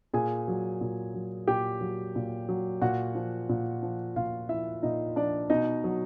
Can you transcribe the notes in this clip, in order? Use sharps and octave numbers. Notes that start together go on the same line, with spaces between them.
A#2 G#4 G#5
F#3
A#2
F#3
A#2 G4 G5
F#3
A#2
F#3
A#2 F#4 F#5
F3
A#2
F3
A#2 F4 F5
F3 E4 E5
A#2 D#4 D#5
F3 D4 D5
B2 D#4 D#5
F#3